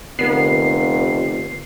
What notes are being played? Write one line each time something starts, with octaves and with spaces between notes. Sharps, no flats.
F1 D3 B3 A#4 C7